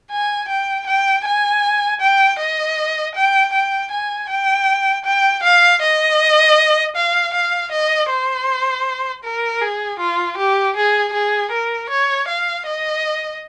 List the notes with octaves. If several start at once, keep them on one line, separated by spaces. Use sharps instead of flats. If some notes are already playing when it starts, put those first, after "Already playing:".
G#5
G5
G5
G#5
G5
D#5
G5
G5
G#5
G5
G5
F5
D#5
F5
F5
D#5
C5
A#4
G#4
F4
G4
G#4
G#4
A#4
C#5
F5
D#5